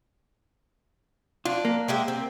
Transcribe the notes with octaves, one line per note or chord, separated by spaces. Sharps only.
D4 F4
A#3
G#3 G4 E5
C4